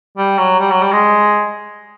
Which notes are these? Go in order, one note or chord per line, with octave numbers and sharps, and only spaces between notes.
G3
F#3
G3
F#3
G3
G#3